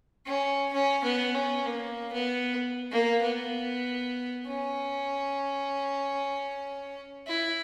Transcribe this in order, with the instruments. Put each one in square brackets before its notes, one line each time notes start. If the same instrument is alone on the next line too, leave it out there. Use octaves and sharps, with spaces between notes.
[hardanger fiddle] C#4
C#4
B3
C#4
A#3
B3
A#3
B3
C#4
E4